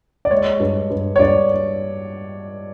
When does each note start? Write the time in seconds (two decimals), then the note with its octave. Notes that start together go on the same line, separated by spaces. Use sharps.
0.25 D5
0.31 G#3 C#5
0.60 G2
0.90 G2
1.16 C#5
1.19 G2 D5